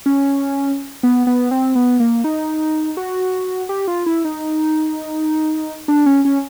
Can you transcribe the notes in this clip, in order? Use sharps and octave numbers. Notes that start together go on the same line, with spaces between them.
C#4
B3
B3
C4
B3
A#3
D#4
F#4
G4
F4
E4
D#4
D4
C#4
C#4